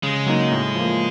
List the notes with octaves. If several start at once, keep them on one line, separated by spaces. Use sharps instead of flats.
C#3 G#3
F#3 A#3 D#4
A2
F3 A#3